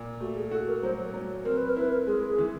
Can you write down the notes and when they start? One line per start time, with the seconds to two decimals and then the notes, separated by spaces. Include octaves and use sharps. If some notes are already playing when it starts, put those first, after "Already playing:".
Already playing: A#2
0.20 A3 F#4
0.36 G#4
0.51 F#4 A4
0.68 A#4
0.83 F#3 C5
1.14 F#3
1.45 C4 A#4
1.57 B4
1.69 A#4
1.77 E4 B4
1.93 A#4
2.07 G#3 G#4
2.38 E3